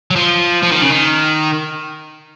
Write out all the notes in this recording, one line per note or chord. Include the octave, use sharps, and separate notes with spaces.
F#3
F3
F3
D#3
C#3
D#3